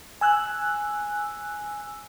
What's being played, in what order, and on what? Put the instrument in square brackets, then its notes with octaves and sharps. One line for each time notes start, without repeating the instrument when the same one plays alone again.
[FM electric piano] G#5 E6 F#6